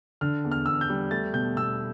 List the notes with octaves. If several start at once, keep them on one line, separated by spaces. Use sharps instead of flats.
D3 F6
E2
F6
E2 E6
F6
G6
G3
A3 A6
B2 G6
B2 E6